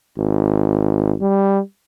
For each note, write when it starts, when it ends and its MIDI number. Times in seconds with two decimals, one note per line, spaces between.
0.18 1.15 32
1.21 1.60 55